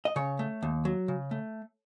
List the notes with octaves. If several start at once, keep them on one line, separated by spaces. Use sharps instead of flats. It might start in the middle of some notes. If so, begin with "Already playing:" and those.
D#5
C#3 C#5
A3
D#2
F#3
C#3
A3